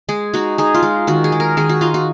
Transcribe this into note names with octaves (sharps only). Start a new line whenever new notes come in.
G#3 G#4
D#4 F#4
D#4 G#4
F4
G#3
D#3 F#4
G#4
G#3
A#4
D#3 G#4
F#4
D#4 F4
F#4